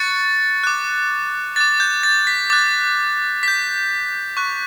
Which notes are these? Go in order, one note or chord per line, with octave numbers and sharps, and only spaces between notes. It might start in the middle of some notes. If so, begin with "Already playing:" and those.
Already playing: C#6 F#6 A6 C#7
D6 F#6
D6 F#6 A6
G6
A6
B6
D6 F#6 A6
D6 G6 B6
C#6 F#6